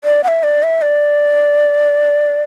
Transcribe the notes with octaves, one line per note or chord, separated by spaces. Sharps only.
D5
F#5
E5
D5
E5
D5